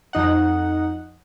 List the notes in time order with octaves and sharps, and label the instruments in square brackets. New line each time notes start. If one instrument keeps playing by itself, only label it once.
[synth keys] F2 D#4 F#5